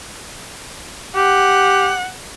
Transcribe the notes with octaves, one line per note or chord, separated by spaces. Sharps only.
G4 F#5